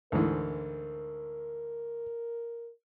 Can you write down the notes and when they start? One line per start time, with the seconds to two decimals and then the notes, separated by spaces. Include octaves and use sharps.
0.12 D2 G#2 E3 A#4